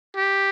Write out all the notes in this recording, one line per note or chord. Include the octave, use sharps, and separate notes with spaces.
G4